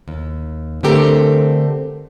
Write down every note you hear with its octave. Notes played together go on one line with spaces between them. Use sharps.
D#2
D3 A3 C4 G4 A4 A#4